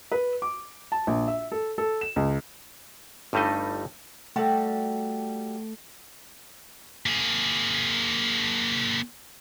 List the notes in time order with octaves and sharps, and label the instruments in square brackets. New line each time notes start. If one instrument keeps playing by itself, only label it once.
[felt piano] B4
D6
A5
A#1
E5
A4
A4
E7
C#2
[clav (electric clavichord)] G1 G2 G3 A3 D#4 D#5
[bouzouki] G3 F#4 A5 [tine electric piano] A3 A4
[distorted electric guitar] A#3 G#4